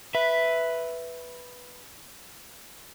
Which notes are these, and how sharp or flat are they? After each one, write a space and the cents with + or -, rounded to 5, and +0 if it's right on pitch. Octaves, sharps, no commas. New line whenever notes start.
B4 +0 E5 +0